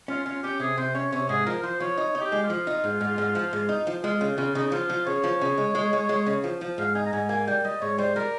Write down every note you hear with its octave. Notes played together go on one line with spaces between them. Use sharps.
C#4 F4
C#4 F4
C#4 G4
C3 G#4
C3 C5
C#4 C#5
C3 C#5
G#2 G#4
F3 A#4
F3 C5
F3 C#5
D#4 C#5
D#4
G4
G#3
F4
F3
D#4
G#2
G#2
G#2
F3
G#2
D#4
F3
G#3 F4
C#3 F4
C#3 F4
C#3 D#4
D#4
F3 F4
F3
C#3 C#5
F3
C#3
G#3
G#3
G#3
G#3
C#3
F3
F3
G#2 F5
D#4 G#5
A#5
G#2 G#5
A#3 G#5
G3 G5
G3 D#5
G#2 C#5
G3 C5
G3 A#4